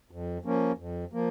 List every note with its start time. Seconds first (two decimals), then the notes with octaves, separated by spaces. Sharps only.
0.11 F2
0.45 F3 A#3 C#4
0.78 F2
1.13 F3 A#3